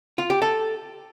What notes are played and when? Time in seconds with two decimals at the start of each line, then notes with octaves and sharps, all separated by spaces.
0.18 F4
0.30 G4
0.42 A4